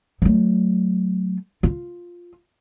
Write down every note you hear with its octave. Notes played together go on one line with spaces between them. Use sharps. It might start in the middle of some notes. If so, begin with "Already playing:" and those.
F#3 A3
F4